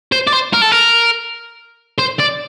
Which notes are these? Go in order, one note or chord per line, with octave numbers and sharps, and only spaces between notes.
C5
D5
C5
A#4
A4
A#4
C5
D5